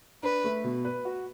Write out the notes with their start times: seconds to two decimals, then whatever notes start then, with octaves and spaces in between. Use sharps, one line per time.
0.23 D4 B4
0.44 A3
0.64 B2
0.85 B4
1.05 F#4